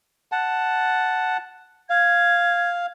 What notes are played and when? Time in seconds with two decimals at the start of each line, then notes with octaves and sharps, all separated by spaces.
0.32 F#5 A5
1.90 F5 G#6